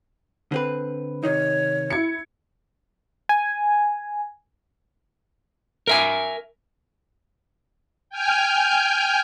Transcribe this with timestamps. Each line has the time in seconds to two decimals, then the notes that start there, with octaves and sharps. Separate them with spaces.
0.52 D3 C4 B4
1.23 C3 D#3 D#4 C#5
1.90 E4 G#6 C#7
3.29 G#5
5.87 A#4 E5 G#5
8.10 G5 G#5 F6 G6